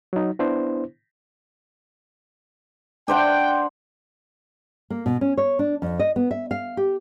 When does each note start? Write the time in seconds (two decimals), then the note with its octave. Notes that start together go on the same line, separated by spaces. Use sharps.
0.13 F#3 D#4
0.39 B3 D4 E4 C5
3.08 D4 C5 F#5 G5
4.90 A#3
5.06 B2
5.21 C#4
5.37 C#5
5.59 D4
5.82 F2
5.99 D#5
6.16 B3
6.31 E5
6.51 F5
6.77 G4